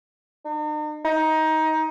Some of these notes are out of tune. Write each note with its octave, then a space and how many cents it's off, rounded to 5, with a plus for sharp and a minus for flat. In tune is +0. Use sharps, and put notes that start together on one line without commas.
D#4 -45
D#4 +20